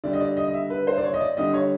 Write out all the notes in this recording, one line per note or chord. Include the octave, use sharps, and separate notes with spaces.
D3 G3 D5
D#5
D5
D#5
D#5
E5
B4
C5
D5
C#5
D#5
D5
D3 G3 D#5
C#5